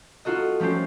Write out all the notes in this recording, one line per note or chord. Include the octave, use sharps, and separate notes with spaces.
D#4 F4 F#4 A4 D#5
F3 A3 C#4 G4 C5